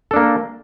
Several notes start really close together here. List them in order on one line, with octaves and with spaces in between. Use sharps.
A4 D4 A#3